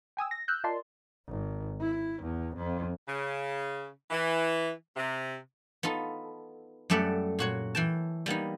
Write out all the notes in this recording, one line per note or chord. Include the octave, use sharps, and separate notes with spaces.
G5 G#5 D#6 E6
A#6
E6 F#6 G6
F4 A#4 D5 D#5 A5 C6
G#1
E4
E2
F2
C#3
E3
C3
B3 D#4 F4 A4
F#2 G3 A3 D5 E5 F#5
A#2 F#4 C#5
E3 G5 A5
G3 A#3 B3 D#4